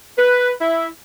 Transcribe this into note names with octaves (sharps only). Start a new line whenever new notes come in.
B4
E4